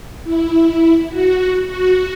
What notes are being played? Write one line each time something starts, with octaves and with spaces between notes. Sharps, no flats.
E4
E4
F#4
F#4
F#4